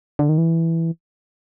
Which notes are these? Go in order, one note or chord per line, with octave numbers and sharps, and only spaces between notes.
D3
D#3
E3